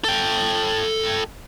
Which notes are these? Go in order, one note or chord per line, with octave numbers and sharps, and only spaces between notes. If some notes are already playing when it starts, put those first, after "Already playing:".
A4 G5